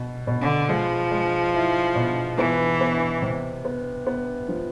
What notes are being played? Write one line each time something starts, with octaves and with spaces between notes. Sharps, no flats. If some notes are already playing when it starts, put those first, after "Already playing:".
Already playing: B2
B2
D3
F3 G#3
G#3
E4
B2
E3 B3
B3
C3
B3
B3
F3